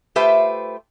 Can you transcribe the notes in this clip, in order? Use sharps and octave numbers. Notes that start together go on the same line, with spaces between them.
A3 F4 G4 B4 C5 E5